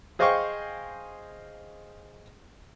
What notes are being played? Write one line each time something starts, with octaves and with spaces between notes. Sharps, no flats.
G#4 C5 D#5 F5 G5 C#6